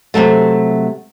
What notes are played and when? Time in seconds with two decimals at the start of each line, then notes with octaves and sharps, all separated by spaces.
0.14 C3 E3 F#3 A3